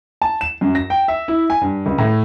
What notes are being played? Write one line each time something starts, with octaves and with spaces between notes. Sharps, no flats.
A5
E7
F#2
A#6
G5
E5
E4
G#5
G2
C#2
A2